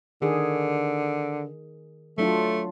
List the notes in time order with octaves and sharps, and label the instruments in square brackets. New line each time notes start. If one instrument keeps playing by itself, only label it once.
[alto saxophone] D3 [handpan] D#3 G#4
[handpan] F#3 D4 F4 [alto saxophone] A3